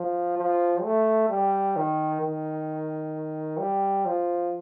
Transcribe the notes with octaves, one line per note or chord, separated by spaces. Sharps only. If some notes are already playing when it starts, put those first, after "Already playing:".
Already playing: F3
F3
A3
G3
D#3
D#3
G3
F3